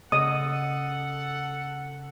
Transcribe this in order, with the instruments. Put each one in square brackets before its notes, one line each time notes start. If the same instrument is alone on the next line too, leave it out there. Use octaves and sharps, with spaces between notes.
[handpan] C#3 [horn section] A4 F#5 [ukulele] D#5 [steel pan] D#6